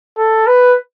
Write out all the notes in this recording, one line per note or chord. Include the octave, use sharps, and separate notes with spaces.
A4
B4